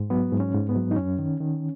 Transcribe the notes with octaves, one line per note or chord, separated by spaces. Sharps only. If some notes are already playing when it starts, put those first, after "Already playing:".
Already playing: G#2
F#3 B3
G#2
C#4
G#2
B3
F#3
D#4
F#2 C#4
D#3
D#3